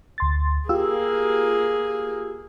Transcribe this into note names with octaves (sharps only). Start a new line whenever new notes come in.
D2 C6 A6
A#3 F4 G4 G#4 E6